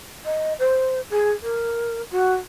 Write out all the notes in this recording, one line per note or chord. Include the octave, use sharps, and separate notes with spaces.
D#5
C5
G#4
A#4
F#4